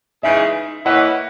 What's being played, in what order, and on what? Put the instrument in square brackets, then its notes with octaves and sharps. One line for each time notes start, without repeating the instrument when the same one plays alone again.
[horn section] C#3 E3 G#3 D#4 G#4 [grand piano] E5
[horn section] E3 A#3 C#4 E4 B4 [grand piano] D#5 F#5